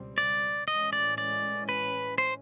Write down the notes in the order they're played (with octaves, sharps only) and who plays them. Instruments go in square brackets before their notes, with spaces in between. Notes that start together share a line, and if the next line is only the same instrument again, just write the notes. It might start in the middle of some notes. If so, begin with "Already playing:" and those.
Already playing: [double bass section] C#2 B2 G3 C4
[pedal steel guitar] D5
[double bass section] A2 E3 G#3 C#4 [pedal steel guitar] D#5
[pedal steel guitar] D5
D5
B4
C5